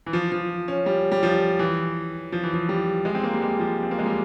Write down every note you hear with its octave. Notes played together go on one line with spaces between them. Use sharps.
E3
F3
F3
C#4
G3
G3
F3
E3
F3
E3
F3
G3
G#3
C4
A#3
G3
G#3
F3
C4
A#3
G#3
G3